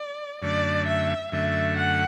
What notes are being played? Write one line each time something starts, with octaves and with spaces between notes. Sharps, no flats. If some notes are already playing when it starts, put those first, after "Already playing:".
Already playing: D5
F#2 D3 A3 D5
E5
F#2 D3 A3 E5
F#5